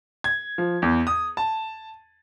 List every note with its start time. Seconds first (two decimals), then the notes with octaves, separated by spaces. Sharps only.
0.24 G#6
0.58 F3
0.82 E2
1.07 D#6
1.37 A5